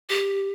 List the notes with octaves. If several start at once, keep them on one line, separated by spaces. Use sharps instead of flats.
G4